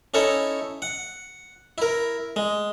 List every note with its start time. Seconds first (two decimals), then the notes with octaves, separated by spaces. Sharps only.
0.14 C#4 D#4 E4 A4 C#5
0.82 F#5
1.78 E4 A#4
2.36 G#3